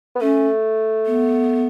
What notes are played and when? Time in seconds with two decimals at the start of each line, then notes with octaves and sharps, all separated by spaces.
0.15 B3
0.21 A3 C#4
1.06 B3